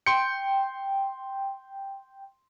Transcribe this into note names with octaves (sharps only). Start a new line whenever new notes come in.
G5 C6 C#7